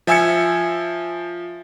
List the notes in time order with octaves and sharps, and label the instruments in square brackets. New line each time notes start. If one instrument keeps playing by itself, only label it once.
[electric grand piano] F3 E5 G#5 E6 G#6 C#7